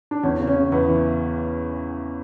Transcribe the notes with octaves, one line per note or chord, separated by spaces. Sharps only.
D4
E2 C#4
C#3
C#4
C#3
E2 B3
E3